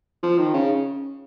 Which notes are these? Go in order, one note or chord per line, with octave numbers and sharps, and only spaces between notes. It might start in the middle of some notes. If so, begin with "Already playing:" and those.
F3
D#3
C#3